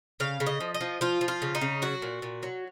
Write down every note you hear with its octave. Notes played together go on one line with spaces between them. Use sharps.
C#3 F5
C#3
D#5
F3
D#5
F3
F3 F4
F3
F4
C#3
D#4
C#3
F#3 F#4
A#2
A#2
F#3